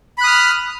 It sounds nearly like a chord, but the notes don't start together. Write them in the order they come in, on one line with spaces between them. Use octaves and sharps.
B5 F#6 D#6 F6